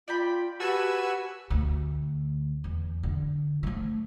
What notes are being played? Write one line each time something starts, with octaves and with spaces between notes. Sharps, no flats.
F4 D5 G5 B5
F#4 G4 B4 G#5 A5 E6
D2
E2
D3
F3 A3